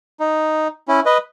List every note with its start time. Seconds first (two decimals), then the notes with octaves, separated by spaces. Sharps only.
0.20 D#4
0.88 C#4 E4
1.06 B4 D#5